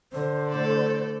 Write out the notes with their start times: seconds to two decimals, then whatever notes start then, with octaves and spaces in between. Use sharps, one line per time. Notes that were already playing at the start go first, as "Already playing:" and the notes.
0.13 D3 C5
0.48 A2 A4 D5